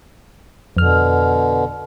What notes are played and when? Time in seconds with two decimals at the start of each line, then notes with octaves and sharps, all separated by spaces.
0.77 F2 B2 D3 F6